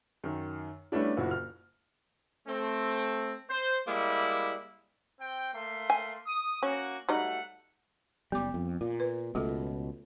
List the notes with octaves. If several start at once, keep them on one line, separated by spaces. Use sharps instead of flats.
F#2 D#3
G3 A3 B3 C#4 D4 E4
F#1 A#2 E4 F#4
F6
A3 C4
C5
G3 G#3 A#3 E4
C4 G5
A3 A#3 C6
G#5
D#6
A#3 C#4 F#4
F#3 G3 A3 D#4 F#5
F#1 G3 B3 D6
F2
A#2 F4
B4
C#2 B2 A3 F4 A4